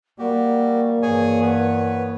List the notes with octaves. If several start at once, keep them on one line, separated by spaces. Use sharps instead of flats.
G3 A#3 F#4 G4
G2 E3 G#4 C#5 G#5
B3 B4 C#5